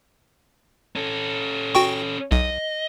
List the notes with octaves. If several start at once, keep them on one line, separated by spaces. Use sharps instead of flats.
C#4 A4
F#4 G5 C#6
B1 D#5